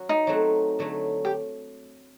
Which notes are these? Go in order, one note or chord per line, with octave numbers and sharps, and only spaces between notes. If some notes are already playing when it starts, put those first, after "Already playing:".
Already playing: F#3 F#4
D#4
F#3 A3 C4 F#4
D3 F#3 A3
G4